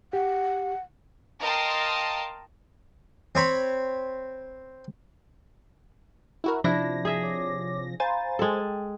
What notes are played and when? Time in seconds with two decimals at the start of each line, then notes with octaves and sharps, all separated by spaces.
0.13 G4 F#5
1.41 A#4 D#5 F5 G5 A5 C6
3.35 C4 C#5 B5
6.44 E4 F#4 A#4
6.64 C3 F3 D4 E4 A#6
7.05 G#4 E5
7.22 C#5 D6
8.00 C5 F5 G#5 A#5 B5 A6
8.39 G#3 A4 G5